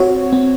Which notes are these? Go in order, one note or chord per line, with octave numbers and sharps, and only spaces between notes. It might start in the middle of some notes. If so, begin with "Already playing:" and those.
Already playing: C4 F#4 C#5
C4